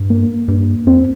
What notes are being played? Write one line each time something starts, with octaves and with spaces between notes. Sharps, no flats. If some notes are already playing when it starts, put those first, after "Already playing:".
Already playing: G2
A#3
G2
F2 C4